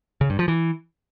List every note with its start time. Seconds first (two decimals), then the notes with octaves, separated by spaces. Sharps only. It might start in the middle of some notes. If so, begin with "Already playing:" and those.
0.21 C#3
0.30 G2
0.39 F3
0.48 E3